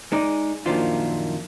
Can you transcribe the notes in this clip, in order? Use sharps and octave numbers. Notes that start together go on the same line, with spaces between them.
G#3 D#4 D5
F#2 A#2 D#3 F3 D4 F4